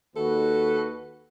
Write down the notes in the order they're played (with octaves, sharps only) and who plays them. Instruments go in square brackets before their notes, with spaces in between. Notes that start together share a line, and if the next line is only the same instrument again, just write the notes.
[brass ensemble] D#2 F#4 B4 [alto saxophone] A4